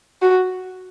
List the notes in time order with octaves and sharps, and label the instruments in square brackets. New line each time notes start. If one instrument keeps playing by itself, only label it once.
[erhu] F#4